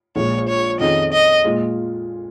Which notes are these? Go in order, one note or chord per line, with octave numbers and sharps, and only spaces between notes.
A#1 A#2 G#3 C#5
C#5
F2 D#3 C#4 G#4 D#5
D#5
A#2 G#3 F4